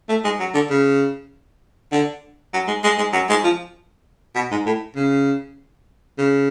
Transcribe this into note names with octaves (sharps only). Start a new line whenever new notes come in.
A3
G#3
F#3
D3
C#3
D3
F#3
G#3
G#3
G#3
F#3
G#3
F3
B2
G#2
A2
C#3
C#3